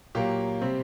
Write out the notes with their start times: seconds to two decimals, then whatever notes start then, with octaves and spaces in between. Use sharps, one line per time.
0.15 A#2 F#3 A#3 G4
0.61 C3 G3 C4